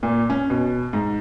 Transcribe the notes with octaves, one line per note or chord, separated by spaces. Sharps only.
A#2
C#4
B2
G#2